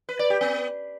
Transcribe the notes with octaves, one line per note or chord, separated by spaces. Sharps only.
B4
D5
G4
B3